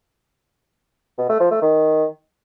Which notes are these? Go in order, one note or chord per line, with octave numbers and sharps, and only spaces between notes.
B2
A3
F3
A3
D#3